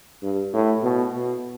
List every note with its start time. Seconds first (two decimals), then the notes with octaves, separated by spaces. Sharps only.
0.23 G2
0.53 A2
0.83 B2
1.12 B2